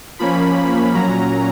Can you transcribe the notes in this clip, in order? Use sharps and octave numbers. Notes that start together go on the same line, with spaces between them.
F3 A#3 C#4 B5
A#2 F#3 C#4 A#5